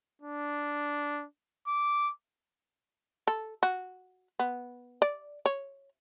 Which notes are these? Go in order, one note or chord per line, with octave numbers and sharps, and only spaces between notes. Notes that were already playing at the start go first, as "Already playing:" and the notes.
D4
D6
A4
F#4
B3
D5
C#5